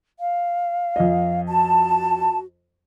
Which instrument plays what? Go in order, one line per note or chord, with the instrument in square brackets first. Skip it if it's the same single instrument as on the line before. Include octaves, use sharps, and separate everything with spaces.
[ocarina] F5
[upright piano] F2 D#5
[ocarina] F#4 [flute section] A5